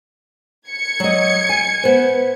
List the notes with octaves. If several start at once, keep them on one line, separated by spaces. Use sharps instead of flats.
G#6 C#7
F#3 D#5
G#5
B3 C5